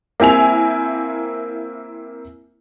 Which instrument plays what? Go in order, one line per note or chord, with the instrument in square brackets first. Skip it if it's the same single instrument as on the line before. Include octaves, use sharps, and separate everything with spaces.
[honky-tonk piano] A#3 C4 E4 G#5 F7